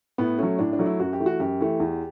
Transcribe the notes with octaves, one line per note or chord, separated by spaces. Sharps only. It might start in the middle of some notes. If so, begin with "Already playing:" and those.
A2 B3
F#3 A3 C#4
A2 D4
D4
F#3 A3
E4
F#2 F#4
G4
E3 A3
F#4
F#2 G4
E3 A3
E2